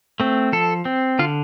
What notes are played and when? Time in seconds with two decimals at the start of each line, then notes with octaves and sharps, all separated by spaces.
0.20 A3 C4
0.52 F3 A4
0.85 C4
1.19 D3 F4